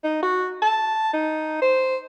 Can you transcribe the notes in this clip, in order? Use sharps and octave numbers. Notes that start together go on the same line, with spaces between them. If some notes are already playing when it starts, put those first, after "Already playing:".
D#4
F#4
A5
D#4
C5